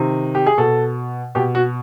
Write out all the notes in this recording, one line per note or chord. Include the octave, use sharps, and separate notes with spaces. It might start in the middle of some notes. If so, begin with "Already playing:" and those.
Already playing: C3 D#3
G4
G#4
B2 A4
B2 G4
F#4